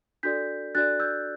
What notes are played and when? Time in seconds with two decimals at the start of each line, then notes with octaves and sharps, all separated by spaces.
0.23 D4 F#4 A4 D5 G6 B6
0.75 D4 F#4 A4 D5 F#6 A6
1.00 E6 G6